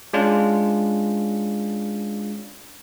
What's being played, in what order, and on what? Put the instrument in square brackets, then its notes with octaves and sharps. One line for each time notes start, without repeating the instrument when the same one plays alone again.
[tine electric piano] G#3 C#4 D4 F4